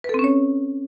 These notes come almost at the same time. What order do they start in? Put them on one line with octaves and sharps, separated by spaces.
B4 A4 C4 C#4 C#5